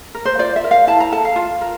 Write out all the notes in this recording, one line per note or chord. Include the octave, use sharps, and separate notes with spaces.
A#4
C5
F4 D5
E5
A#4
F5
E4 A5
A#5
A4 A5
F5
F4
A#4